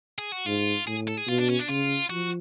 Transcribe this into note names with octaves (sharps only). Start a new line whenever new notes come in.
G#4
F#4
G#2 F4
A2 G#4
A4
G#4
B2 F4
D4
C#4
D4
C#3 F4
F3 F#4